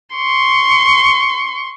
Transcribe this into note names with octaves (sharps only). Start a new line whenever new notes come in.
C6 C#6